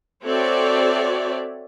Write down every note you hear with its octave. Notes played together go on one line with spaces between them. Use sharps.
C4 F#4 A4 C#5 D5 E5